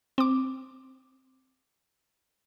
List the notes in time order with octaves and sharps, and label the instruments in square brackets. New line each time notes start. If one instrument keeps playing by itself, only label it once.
[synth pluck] C4 D6